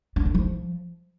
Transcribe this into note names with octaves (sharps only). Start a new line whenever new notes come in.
D4
D3
F3